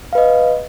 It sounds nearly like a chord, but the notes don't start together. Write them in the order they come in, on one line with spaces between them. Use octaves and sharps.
F5 B4 D#5